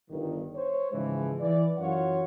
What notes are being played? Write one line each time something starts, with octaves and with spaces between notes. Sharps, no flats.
G1 G2 D#3
C5 C#5
G#2 C#3 E3 F3 G#3
E3 D5
F#2 E3 F#3 F4 C#5 F#5